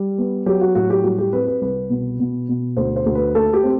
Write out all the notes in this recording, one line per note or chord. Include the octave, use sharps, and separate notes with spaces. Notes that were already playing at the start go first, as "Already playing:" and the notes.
Already playing: G3
B3
F#3 G4
F#4
A2 F#4
G4
G3 F#4
G4
C4 B4
B4
C2 B4
B2
B2
B2
D2 C5
C5
D2
B4
A3 A4
G4
C4